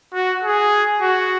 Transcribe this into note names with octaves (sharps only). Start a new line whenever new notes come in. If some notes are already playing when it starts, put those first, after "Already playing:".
F#4
G#4
F#4